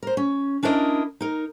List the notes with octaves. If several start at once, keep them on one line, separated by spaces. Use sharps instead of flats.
A#4 C5
C#4
C#4 D4 E4 A#4 C#5 D#5
D#4 A#4